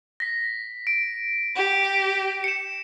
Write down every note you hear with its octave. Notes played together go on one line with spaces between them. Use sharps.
A#6 B6
D7
G4
C#7 E7